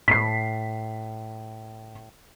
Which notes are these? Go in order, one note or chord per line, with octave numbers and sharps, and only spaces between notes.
A2 B6 C7